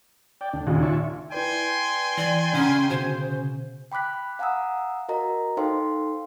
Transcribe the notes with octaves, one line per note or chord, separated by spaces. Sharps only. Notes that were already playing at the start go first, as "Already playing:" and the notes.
D5 G5
D2 D4
D#2 A#2 C#3 D#4
D5 E5 C#6
E4 B4 D5 G5 G#5 C6
E3 D5
C#3 C#4 D4 F#5 A#5
B2 D3 F#4 C5
G5 B5 D6 F#6 B6
F5 F#5 G#5 A#5 D#6 E6
F#4 A#4 D#5 A#5
D#4 A4 C5 F5 G5 C6